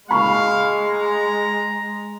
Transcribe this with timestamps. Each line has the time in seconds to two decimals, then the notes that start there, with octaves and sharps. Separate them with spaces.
0.11 G#3 F5 B5 C#6
0.84 A#5